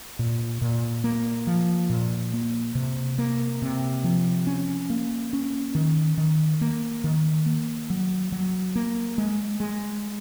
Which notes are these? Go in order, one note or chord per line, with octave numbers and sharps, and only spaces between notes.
A#2
A#2
A#3
F3
A#2
A#3
C3
A#3
C3
F3
C#4
A#3
C#4
D#3
D#3
A#3
D#3
A#3
F#3
F#3
A#3
G#3
G#3